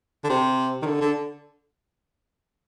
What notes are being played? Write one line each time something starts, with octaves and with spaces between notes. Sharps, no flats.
D3
C3
D#3
D3
D3